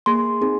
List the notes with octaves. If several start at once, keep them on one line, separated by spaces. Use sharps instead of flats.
A#3 G#4 C6
C4 D#4 G#4